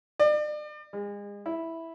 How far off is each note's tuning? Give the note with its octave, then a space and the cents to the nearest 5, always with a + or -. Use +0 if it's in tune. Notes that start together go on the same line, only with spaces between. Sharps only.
D5 +40
G#3 -35
E4 -5